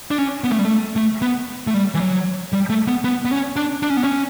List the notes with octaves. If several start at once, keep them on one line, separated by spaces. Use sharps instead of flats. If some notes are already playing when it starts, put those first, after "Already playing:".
D4
C#4
B3
A3
G3
A3
A3
B3
A3
G3
E3
F#3
G3
A3
B3
B3
B3
C#4
D4
D4
C#4
B3
C#4